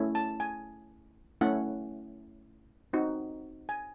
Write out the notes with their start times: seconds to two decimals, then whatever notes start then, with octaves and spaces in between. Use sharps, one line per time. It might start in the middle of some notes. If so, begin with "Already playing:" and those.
Already playing: A3 C#4 E4
0.15 A5
0.40 G#5
1.41 A3 C#4 E4 F#5
2.93 C4 D#4 F#4
3.69 G#5